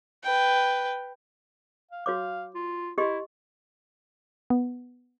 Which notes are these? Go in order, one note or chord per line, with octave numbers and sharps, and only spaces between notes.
B4 G5
F5
F#4 C#5 F5 D6
F4
E4 G4 D#5 C6
B3